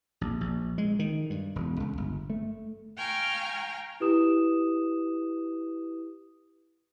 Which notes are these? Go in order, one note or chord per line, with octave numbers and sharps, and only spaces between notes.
A#1
A#1
G#3
D#3
G2
E1
C#2
G1
A3
F5 G5 G#5 A#5 C#6 F6
E4 G4 B4 D#6 E7